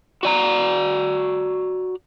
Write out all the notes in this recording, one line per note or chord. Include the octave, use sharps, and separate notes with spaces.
F#4 D5 A#5